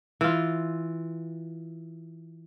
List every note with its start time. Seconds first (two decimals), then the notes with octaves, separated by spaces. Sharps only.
0.21 E3 F4